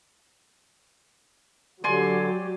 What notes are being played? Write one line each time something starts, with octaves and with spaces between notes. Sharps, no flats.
D3 F#3 G4 D5 G#5 C6